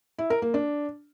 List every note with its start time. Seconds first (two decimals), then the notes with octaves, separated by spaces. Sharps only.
0.18 E4
0.30 A#4
0.42 A#3
0.54 D4